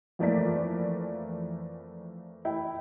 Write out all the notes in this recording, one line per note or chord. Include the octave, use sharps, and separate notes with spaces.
F2 E3 A3 A#3 D5 B6
E4 G5